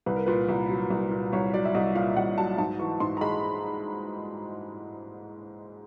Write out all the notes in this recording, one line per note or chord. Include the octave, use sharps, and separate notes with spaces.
C2 B4
A#4
A#2 B4
C2
F#3
C2
A#2
C2 C#5
F#3 D5
E5
C2 D#5
A#2 F5
C2 F#5
F#3 A5
G#2 A5
E3 C#6
G#2 C6
A#5
G#3 B5